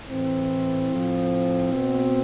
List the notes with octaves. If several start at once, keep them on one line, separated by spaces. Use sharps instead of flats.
A2 E3 C4
A2 F3
B2